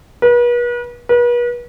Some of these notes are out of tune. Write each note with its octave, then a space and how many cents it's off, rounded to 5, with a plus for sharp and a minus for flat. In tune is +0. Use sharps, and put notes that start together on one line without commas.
B4 -40
B4 -40